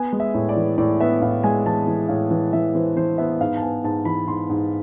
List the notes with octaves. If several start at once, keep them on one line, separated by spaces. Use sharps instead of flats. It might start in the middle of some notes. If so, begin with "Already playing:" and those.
Already playing: B3 G#5
G#3
E5
A2
D5
E3
A2 D5
B3 E5
A2 F5
G#3 G#5
E3 A5
E3
A2 F5
E3
E3 E5
E3 C5
E3 C5
B3 E5
G#2 F5
A5
B3 G#5
G#2 A5
E3 B5
G#2 C6
G#2